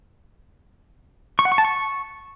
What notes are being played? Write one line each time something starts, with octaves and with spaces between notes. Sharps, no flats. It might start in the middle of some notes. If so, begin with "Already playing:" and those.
C#6
F#5
C#6
A5
C#6